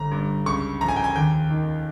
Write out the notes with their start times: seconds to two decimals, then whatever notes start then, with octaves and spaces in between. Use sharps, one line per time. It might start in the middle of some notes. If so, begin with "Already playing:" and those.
Already playing: G1 A#5
0.11 G2
0.46 C#2 C#6
0.81 F3 A#5
0.88 G#5
0.96 G5
1.04 G#5
1.16 D#2 G5
1.50 D#3